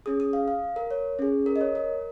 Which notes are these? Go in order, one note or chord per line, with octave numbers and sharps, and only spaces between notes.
C#4 G#4 D#6
D#6
F5
F5
A#4
C#5
C#4 G#4
A#4
D#5
C#5
A#4